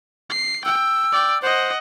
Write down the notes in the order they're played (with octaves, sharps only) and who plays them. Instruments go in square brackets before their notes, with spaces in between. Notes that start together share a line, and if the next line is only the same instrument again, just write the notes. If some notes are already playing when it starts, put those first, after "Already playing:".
[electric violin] C7
[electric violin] G5 [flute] E6
[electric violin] D5 G5
[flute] C5 [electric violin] D#5 F#5